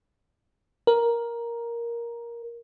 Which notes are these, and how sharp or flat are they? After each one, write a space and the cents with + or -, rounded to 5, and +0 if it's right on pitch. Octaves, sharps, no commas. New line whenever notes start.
A#4 +10